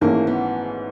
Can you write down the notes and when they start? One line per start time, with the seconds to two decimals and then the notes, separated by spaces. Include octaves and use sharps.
0.01 G#1 G#2 E3 A3 A#3 C#4
0.27 B3